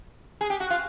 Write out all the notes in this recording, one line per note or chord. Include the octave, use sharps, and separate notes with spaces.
G#4
G4
F#4
F4